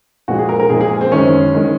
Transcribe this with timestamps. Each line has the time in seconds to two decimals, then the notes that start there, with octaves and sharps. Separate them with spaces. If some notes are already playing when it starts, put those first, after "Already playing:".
0.28 A#2 F3 G#3 F#4
0.39 G#4
0.49 A#4
0.60 A#4
0.70 A#2 F3 G#3 G#4
0.81 G#4
1.01 C4
1.12 F#2 D#3 G#3 C#4
1.55 D#3 G#3